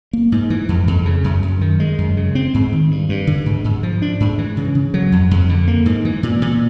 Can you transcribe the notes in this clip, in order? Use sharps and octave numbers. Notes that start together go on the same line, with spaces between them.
A#3
G#2
E3
F2
F2
C#3
F#2
F#2
D#3
G#3
F#2
C#3
C4
G#2
D#3
G2
G2
D3
G#2
G#2
F3
D4
G#2
E3
C#3
C#3
F#3
F2
F2
D3
A#3
G#2
E3
A#2
A#2